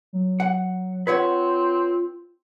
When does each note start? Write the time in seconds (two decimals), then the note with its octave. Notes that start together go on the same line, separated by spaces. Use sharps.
0.13 F#3
0.40 F#5
1.07 C4 F4 B4 C#5 F#5